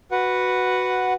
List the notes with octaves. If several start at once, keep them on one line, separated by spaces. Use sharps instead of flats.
F#4 B4 F#5